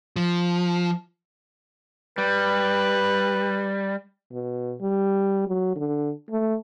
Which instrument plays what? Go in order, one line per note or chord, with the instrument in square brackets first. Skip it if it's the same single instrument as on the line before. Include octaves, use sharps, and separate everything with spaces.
[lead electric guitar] F3
[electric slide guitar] G3 [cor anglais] B4
[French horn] B2
G3
F#3
D3
A3